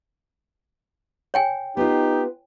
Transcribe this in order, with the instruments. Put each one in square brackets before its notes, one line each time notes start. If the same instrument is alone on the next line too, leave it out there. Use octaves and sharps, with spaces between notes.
[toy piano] C#5 G5 G#5
[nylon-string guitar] B3 F4 [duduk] D#4 [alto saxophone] G4